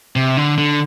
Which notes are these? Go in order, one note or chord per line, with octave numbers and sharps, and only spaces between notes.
C3
D3
D3